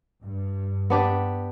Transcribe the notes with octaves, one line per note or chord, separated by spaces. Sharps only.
G2
B3 D4 G4